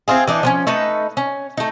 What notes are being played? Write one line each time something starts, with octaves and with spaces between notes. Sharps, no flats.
C4 E4 F4 G#4
E3 D4 D#4
F3 B3 C#4
A3 D#4 A4 B4
C#4
A3 D#4